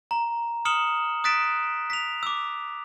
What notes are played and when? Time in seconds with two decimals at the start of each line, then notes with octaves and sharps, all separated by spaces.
0.11 A#5
0.65 D#6 F6 C#7 E7 F#7 G7
1.24 D#6 F#6 A6 B6 D7 E7
1.90 B6 F7
2.23 D6 E6